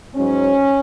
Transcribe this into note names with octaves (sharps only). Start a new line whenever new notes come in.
G#2 F#3 C#4